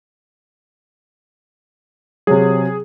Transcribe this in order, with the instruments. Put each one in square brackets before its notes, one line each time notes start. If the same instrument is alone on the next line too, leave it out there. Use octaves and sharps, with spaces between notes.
[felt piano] C3 F#3 [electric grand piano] G#4